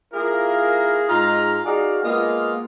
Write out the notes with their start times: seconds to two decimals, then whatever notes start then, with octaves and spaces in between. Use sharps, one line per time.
0.13 A#3 E4 F4 G#4 A#4
1.09 G#2 G#3 D#4 F4 A#5
1.65 D#4 F#4 G#4 D5 D#5 F5
2.04 G#3 A#3 B3 F4 D#5